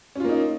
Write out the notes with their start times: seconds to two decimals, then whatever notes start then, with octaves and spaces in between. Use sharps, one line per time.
0.16 C#4
0.20 F4
0.25 A#3
0.29 D#4